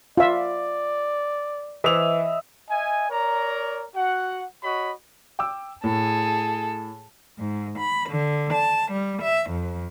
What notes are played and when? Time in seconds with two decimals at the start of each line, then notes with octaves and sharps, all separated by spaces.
0.17 F4 D5 E5
1.84 E3 D#5 E5 F7
2.69 D#5 E5 G#5
3.10 A#4 C#5 D5 A#5
3.95 F#4 F#5
4.63 F#4 C#5 D#5 B5
5.39 G5 D6 E6
5.84 A2 G#4 A4
7.38 G#2
7.78 B5
8.09 D3
8.52 A5
8.91 G3
9.21 E5
9.50 F2